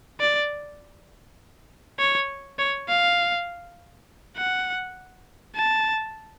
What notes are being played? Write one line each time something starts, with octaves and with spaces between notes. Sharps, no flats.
D5
C#5
C#5
F5
F#5
A5